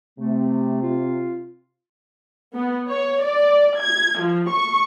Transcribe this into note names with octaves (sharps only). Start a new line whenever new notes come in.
C3 A3
F4
B3
C#5
D5
G#6
F3
C#6